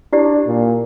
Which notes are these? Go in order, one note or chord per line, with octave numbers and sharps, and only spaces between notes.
D4 E4 G4 D5
A#2